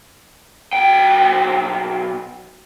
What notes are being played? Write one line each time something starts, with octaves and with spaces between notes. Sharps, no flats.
B1 G5